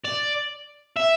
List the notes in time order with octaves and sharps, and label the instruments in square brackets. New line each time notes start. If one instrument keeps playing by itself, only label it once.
[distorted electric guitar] D5
E5